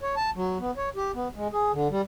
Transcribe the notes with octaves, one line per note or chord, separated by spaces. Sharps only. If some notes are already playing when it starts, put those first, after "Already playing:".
C#5
A5
F#3
B3
C#5
G4
B3
G#3
G#4
D3
G3